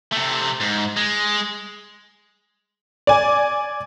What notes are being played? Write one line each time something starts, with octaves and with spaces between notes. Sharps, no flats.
C3 A3
G#2
G#3
D5 G#5